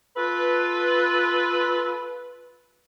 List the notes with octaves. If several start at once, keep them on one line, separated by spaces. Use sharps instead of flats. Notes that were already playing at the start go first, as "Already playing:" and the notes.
F4 A4 B4